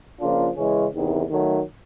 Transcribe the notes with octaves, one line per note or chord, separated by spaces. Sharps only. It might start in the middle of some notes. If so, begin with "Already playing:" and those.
C#3 F3 A#3 D4 F4
C#3 E3 G#3 C#4
E2 C3 D#3
D#3 F#3 A3